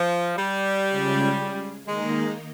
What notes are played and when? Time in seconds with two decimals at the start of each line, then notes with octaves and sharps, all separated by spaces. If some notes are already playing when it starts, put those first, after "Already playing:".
Already playing: F3
0.37 G3
0.87 C#3 G#3 C#4 F4 G#4
1.86 D#3 G#3 A#3 D#4